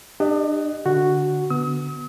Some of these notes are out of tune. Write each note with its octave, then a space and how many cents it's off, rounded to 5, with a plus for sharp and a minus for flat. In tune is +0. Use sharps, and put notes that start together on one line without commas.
D4 +35 G4 +25 D#5 +0
D3 +0 F#4 +0
D3 +0 B3 +0 D#6 +45